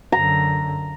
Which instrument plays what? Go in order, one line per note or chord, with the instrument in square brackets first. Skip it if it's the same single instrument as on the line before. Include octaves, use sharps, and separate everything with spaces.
[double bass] F#2 D3 [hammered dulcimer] A#5